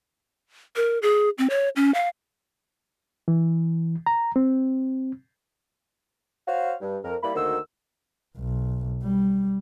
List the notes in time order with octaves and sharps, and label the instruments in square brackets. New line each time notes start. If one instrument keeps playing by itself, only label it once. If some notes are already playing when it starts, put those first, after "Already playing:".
[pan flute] A#4
G#4
C4
C#5
C#4
F5
[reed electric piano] E3
A#5
C4
[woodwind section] F#4 C5 C#5 F5
G2
F2 A#4
G3 A#3 E4 B5
D2 D#3 A#3 F#4 C5 E6
[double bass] B1
G3